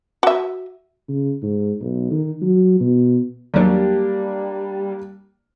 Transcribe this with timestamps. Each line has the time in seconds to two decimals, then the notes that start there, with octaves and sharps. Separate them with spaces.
0.23 F#4 E5
1.09 C#3
1.42 G#2
1.81 B1
2.11 D#3
2.41 F#3
2.80 B2
3.54 D#2 F#3 G3 A#3 D4